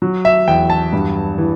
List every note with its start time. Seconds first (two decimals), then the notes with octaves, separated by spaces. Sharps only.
0.02 F#3
0.25 E5
0.48 E2 G5
0.70 A5
0.93 G2
1.38 E3